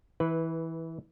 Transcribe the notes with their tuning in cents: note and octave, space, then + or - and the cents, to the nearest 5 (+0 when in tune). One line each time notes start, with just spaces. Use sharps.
E3 -20 B4 +0